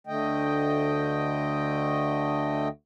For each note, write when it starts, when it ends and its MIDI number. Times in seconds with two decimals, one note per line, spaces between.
0.07 2.68 38
0.07 2.68 50
0.07 2.68 57
0.07 2.68 75
0.07 2.68 79